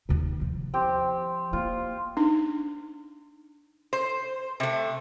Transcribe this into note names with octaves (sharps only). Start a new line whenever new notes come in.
D#2 C3
F3
C4 G4
A#3 F4
D4 D#4
C5
C3 A3